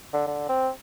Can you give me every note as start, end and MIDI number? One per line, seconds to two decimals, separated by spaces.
0.13 0.25 50
0.27 0.47 50
0.49 0.69 60